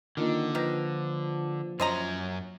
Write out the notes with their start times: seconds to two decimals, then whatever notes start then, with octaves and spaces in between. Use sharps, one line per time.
0.17 D3 D#3 A#3 D4 F4
0.55 D#3 F3 B4 A#6
1.80 F#2 C#4 C5 C#5 D#5 A#5